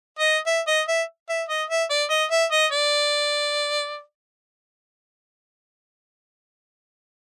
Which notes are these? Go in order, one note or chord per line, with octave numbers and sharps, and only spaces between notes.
D#5
E5
D#5
E5
E5
D#5
E5
D5
D#5
E5
D#5
D5